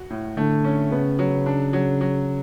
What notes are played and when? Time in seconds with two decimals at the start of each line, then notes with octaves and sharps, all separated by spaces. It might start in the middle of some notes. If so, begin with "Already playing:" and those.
Already playing: F#4
0.10 A2
0.37 D3 A3
0.64 C#4
0.91 C#3 B3
1.19 F#3
1.46 D4
1.73 F#3
2.01 F#3